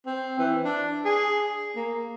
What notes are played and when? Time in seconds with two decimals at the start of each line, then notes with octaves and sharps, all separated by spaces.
0.06 C4
0.39 E3
0.65 D4
1.05 G#4
1.76 A#3